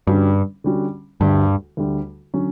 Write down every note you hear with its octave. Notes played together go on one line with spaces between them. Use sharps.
G2 D3 G3 C#4 F#4
D3 G3 C#4 F#4
D2 G2 D3 G3
D2 D3 G3
D3 F#3 C#4